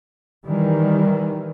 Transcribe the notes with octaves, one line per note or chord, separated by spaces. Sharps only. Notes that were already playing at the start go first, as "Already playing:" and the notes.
D#3 E3 G3